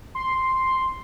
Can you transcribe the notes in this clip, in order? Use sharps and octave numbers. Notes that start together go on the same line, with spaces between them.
C6